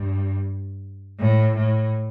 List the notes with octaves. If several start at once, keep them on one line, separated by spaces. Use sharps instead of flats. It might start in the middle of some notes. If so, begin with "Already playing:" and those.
Already playing: G2
A2
A2